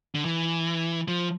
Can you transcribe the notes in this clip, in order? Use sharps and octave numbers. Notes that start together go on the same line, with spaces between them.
D3
E3
F3